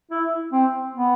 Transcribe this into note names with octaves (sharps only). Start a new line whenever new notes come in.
E4
C4
B3